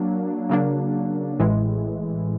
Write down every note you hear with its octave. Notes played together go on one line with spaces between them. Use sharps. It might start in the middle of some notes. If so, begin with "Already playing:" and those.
Already playing: F#3 A#3 D4
C#3 F#3 A#3 D4
A1 A2 E3 G#3